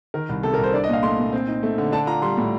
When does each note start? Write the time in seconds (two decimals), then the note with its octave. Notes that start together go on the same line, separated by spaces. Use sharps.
0.14 D#3 A#4
0.29 C2
0.43 C3 A4
0.54 A#4
0.58 C2
0.64 C5
0.74 D4 D5
0.84 D#5
0.88 A#2 F5
1.03 A3 C6
1.18 A#2
1.33 C4
1.48 D#4
1.63 A3
1.78 D3
1.92 D4 A5
2.07 F4 A#5
2.22 G3 C6
2.37 A2